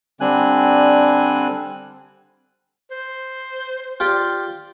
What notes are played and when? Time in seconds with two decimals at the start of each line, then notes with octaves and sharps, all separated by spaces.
0.20 D3 G3 C4 D4 G#5 F#6
2.91 C5
4.00 F4 G4 D5